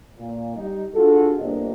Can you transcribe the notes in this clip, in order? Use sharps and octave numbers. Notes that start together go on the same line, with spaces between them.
A#2
G3 D#4
D4 F4 F#4 G#4 A4
G1 C3 A#3 D4 D#5